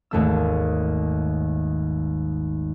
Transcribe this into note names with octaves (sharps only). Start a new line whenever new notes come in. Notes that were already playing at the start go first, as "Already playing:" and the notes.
G#1 D#2 A3 E6